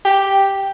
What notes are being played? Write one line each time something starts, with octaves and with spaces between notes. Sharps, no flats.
G4